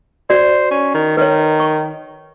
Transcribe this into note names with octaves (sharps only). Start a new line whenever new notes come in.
F#4 C5 D5
C#4
D#3
D#3 B4 C#5
C#6